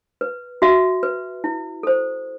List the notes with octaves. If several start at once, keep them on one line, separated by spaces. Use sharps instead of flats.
B4
F#4 E5
B4
E4
A4 C5